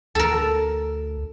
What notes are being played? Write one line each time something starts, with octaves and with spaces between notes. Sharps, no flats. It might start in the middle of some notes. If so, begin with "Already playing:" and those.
D2 A4 A#4